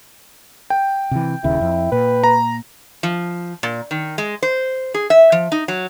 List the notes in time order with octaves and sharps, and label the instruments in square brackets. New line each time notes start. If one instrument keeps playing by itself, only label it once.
[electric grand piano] G5
[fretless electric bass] C3 E3
[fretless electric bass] D#1 D#2 C#3 [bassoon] E4
[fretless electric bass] F2
[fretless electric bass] A#2 [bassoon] B4
[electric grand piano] A#5
[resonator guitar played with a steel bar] F3
A#2
D#3
G#3
C5
G#4
E5
F3
D#4
F#3